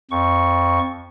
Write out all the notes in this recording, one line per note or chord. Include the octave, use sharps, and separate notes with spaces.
F2 C#6